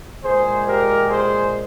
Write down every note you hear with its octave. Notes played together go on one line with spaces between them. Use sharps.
A#2 G#3 G#4 C5
G4 A#4
G#4 C5